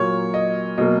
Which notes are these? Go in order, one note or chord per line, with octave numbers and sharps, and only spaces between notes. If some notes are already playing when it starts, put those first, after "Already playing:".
Already playing: A#2 F#3 A#3 C#5
D#5
B2 F#3 A#3 D#5